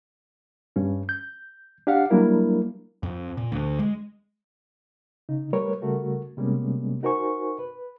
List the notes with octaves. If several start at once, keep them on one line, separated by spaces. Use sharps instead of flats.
G2 C#4
G6
D4 G4 F5 F#5
F#3 G3 A#3 D4 E4 A#4
F2
A#2
D2
G#3
C#3 D#4
G3 A3 A#4 B4 C#5
C#3 G3 A3 F#4 A#4
C3 G3 G#3 A#3 B3 C#4
D#4 F#4 A#4 C5 G#5 C#6
B4